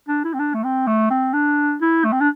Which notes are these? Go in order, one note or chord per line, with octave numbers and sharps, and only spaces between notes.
D4
E4
C4
D4
A3
C4
A3
C4
D4
E4
A3
C4
D4